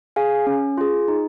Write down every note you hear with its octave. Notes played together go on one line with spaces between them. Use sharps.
G#4 F5 G#5
C#4
F4 G#4
D#4